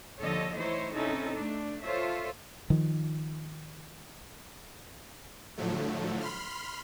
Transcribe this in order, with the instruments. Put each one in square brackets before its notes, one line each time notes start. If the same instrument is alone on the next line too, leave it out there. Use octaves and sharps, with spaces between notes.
[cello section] D#2 D3 F3 A4 C#5 D#5
E3 A3 D#4 E4 C5 C#5
C3 C4 C#4 D#4 E4 A4
A3 D4
F4 A4 C5 C#5 E5
[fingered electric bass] D#3 F3
[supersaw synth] A2 D3 F3 F#3 A3
B5 C6 F6